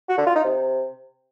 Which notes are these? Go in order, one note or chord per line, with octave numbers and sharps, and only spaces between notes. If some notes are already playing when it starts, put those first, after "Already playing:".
F#4
D3
F4
D#4
C3